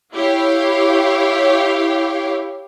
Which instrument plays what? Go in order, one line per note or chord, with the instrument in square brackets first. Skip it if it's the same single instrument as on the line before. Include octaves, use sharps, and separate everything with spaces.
[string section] E4 G4 C#5 F5